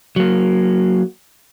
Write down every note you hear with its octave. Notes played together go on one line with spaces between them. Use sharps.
F#3 A#3